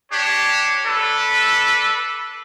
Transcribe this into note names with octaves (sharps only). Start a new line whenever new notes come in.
D4 G4 C#5
D4 A4 B4